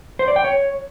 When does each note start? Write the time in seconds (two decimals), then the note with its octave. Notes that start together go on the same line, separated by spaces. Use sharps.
0.19 C5
0.28 D5
0.36 G5
0.44 C#5